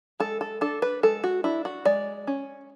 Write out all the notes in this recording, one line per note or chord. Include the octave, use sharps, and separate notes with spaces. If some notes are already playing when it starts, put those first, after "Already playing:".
G#3 A4
A4
D4 A4
B4
G#3 A4
F#4
D4 E4
F#4
G#3 D5
C#4